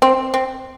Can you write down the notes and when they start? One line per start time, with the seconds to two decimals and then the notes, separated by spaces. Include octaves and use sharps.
0.02 C4
0.34 C4